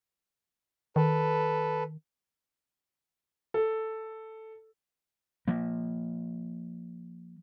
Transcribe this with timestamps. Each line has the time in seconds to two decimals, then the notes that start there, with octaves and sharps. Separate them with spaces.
0.96 D#3 A4 B4
3.54 A4
5.48 F3 A#3